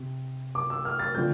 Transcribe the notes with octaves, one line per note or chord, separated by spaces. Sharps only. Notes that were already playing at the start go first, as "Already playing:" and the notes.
Already playing: C3
D6
E6
F6
A6
D3 F3 A3 C4 G6